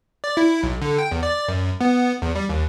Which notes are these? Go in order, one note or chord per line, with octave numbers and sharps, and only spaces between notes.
D5
E4
B1
D3
G5
E2
D5
F#2
B3
E2
G3
D#2